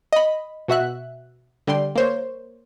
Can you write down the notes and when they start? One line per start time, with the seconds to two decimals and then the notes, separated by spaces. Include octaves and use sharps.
0.13 D#5 B5
0.68 B2 F#4 E5 F#6
1.67 D3 G3 G5 C6
1.95 A#3 C5 C#5